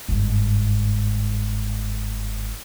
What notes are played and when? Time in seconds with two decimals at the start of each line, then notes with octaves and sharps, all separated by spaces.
0.08 G1 G#2